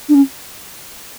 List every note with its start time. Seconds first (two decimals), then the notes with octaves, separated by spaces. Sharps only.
0.09 D4
0.15 C#4